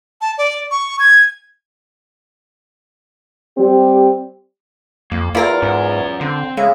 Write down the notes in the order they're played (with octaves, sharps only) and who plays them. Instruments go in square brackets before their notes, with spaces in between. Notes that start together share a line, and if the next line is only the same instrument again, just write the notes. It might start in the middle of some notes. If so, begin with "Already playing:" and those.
[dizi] A5
D5
C#6
G#6
[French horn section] G3 C4 G4
[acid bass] F2 [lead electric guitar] A#3
[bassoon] E2 [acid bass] E4 [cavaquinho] F4 A#4 A#5 [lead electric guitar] D5
[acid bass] G#2 [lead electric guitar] C#4 F#5
[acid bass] D3 [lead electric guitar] C4
[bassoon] C#3 [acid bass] G#3 [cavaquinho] E5